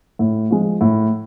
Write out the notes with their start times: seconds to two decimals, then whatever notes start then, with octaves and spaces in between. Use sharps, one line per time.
0.19 A2
0.51 F3 G#3
0.81 A2